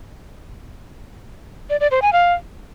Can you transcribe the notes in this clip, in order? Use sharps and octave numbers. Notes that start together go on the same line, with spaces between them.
D5
D5
C5
G#5
F5